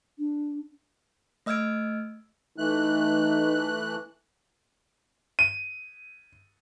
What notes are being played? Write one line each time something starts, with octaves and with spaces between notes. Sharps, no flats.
D4
A3 D#5 E6 F6 G#6 D7
E3 A3 D#4 F#6
D#7